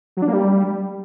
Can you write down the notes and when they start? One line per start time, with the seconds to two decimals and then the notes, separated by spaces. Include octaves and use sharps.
0.17 F#3
0.22 D4
0.28 A#3
0.33 G3